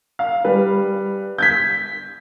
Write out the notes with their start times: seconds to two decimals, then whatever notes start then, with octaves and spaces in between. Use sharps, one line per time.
0.19 F5
0.44 G3 B4
1.38 G6 G#6 B6